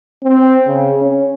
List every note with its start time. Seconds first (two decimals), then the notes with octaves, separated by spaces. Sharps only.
0.23 C4
0.67 C#3
1.02 C#4